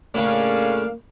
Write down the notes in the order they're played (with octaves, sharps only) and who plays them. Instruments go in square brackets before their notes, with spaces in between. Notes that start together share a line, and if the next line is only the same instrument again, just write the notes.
[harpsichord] A2 C#3 [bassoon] A#3 [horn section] C#4 D4 F5